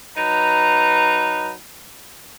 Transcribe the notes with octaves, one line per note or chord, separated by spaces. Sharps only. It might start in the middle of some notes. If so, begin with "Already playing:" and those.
F#3 D#4 B4 A#5